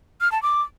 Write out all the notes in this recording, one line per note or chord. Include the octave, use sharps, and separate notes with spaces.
F6
A5
D6